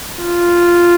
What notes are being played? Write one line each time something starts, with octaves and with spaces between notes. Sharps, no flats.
F4